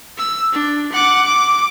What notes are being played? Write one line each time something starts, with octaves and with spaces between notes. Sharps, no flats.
E6
D4
F#5 D6
D6